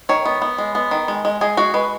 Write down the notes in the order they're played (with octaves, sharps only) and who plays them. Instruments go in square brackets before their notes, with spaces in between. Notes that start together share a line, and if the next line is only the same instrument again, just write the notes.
[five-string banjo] D#3 C#5
B3
B3
G#3
B3
D#3
G#3
G#3
G#3 G#4
G#3 F#4
G#3 B4